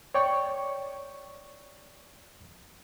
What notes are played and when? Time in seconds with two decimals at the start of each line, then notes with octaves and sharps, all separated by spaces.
0.14 C#5 D5 G5 C#6